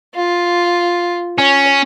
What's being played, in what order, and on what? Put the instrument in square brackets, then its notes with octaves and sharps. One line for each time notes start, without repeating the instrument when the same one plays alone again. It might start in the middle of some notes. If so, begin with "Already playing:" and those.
[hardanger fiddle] F4
[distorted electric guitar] C#4 [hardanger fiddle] C#5